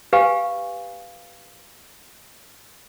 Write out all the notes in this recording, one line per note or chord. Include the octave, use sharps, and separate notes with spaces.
G4 B4 F5 G#5